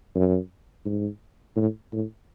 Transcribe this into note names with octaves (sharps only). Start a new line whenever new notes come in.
F#2
G#2
A2
A2